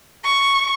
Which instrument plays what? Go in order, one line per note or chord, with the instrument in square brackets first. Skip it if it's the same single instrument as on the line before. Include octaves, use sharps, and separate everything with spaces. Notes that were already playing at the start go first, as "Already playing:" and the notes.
[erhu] C#6